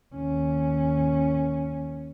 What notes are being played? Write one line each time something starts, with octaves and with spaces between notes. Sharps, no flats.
D#2 C#4